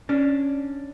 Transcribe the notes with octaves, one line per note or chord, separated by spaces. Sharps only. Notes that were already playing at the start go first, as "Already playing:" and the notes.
C#4 D4